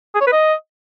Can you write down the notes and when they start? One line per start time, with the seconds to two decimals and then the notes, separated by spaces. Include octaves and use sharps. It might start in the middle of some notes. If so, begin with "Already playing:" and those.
0.15 G#4
0.21 C#5
0.27 B4
0.32 D#5